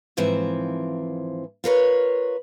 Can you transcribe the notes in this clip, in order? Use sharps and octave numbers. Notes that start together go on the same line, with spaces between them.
D#2 G#2 E3 F3 C4 E5
F4 A#4 B4 C#5